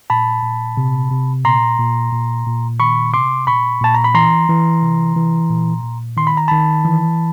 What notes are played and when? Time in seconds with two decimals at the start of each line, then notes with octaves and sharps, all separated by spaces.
0.10 A#2 A5 B5
0.43 A#2
0.77 C3
1.11 C3
1.45 A#2 A#5 C6
1.79 A#2
2.13 A#2
2.46 A#2
2.79 D#3 B5 C#6
3.14 C3 C6 D6
3.47 A#2 B5 C#6
3.81 A#2 A5
3.95 A#5
4.04 B5
4.15 E3 A#5 C6
4.49 E3
4.82 C3
5.16 E3
5.50 A#2
5.83 A#2
6.17 D#3 C6
6.27 B5
6.37 A#5
6.48 D#3 A5 B5
6.85 E3